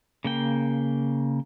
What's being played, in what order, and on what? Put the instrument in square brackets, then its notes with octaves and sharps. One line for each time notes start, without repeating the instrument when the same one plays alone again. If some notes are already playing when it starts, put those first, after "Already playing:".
[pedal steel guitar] C#3 A#3 G5